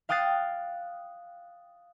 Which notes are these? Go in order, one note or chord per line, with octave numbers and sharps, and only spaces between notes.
F5 G5 D#6 F#6 A6 C7